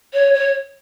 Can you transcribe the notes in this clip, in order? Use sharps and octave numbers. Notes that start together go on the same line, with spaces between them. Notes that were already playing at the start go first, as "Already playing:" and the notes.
C#5
C#5